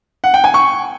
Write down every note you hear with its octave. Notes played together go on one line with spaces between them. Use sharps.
F#5
G5
G#5
C#6